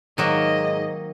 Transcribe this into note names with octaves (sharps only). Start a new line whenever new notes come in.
G#2 D#3 F#3 A#3 D#5